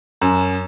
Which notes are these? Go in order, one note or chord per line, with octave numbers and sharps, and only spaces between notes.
F#2